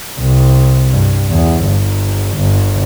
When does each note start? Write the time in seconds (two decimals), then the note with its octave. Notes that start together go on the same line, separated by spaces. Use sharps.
0.20 C2
0.93 G2
1.31 E2
1.65 G1
2.36 G1